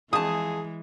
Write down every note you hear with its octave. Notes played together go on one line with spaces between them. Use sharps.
F2 E3 G#3 G#4 A5 D#6